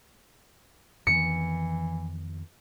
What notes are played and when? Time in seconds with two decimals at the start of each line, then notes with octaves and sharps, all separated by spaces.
1.07 F2 D#3 E3 B3 C#7